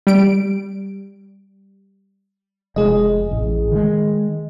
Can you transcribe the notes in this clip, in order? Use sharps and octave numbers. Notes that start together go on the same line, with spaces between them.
G3 D7
F1 G#3 G#4 D#5
A1
D#3 G#3